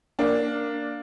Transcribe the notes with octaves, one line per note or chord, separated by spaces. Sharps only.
A#3 D4